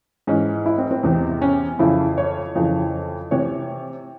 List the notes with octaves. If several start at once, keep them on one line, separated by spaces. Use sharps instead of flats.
G#2 E3 C#4
E4
C4
C4
E2 C3 E3
C#4
F2 C#3 E3 E4
C#5
F2 C#3 E3
C3 E3 C#5